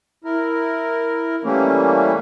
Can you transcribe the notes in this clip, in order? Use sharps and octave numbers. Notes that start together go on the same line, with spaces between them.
E4 A#4
E3 G3 A3 A#3 C#4